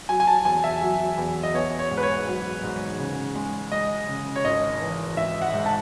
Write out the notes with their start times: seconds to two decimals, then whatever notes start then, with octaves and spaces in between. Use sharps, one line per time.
0.09 F#3 G#5
0.20 G#5
0.27 A5
0.45 E2 G#5
0.64 E5
0.81 F#3
1.18 E2
1.43 D#5
1.54 B3 C#5
1.79 C#5
1.91 G#2
1.97 B4
2.03 C#5
2.27 F#3
2.63 G#2
2.99 C#3
3.35 G#3
3.72 G#3 D#5
4.08 C#3
4.36 C#5
4.45 G#1 D#5
4.81 E3
5.17 G#1 E5
5.42 F#5
5.54 G#2
5.66 A5